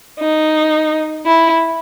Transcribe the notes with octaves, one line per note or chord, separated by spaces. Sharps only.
D#4
E4